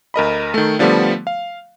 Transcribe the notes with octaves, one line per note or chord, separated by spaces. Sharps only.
D2 A#4 D#5 B5
D#3 A3
D3 F3 G3 A3 B3
F5